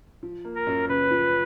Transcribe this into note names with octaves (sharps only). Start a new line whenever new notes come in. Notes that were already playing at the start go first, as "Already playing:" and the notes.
F3
A#3
A#4
F#2
C#3 B4
F3